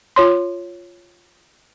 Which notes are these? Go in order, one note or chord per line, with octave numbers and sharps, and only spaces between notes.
F4 C#5 C6